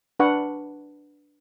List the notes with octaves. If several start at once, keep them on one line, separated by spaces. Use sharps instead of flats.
D4 B4 F#5 C#6